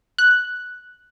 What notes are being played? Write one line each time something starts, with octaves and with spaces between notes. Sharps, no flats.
F#6